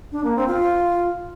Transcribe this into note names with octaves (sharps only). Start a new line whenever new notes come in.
D4
A#3
C4
F4